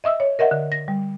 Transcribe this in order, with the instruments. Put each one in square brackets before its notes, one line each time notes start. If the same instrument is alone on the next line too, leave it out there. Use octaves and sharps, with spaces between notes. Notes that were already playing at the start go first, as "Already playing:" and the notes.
[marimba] D#5 E5 D#6 E6
C#5
A#4 D#5 E5 F#5
D3
A#6
G3